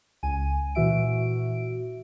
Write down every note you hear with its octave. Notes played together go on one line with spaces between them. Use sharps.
C#2 G#5 D#7
A#2 E3 F#4 E5 D7